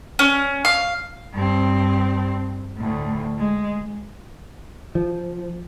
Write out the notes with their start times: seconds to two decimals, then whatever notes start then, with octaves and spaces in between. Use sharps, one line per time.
0.19 C#4
0.65 F5
1.33 G2 C4
2.77 D2 A2
3.38 G#3
4.95 F3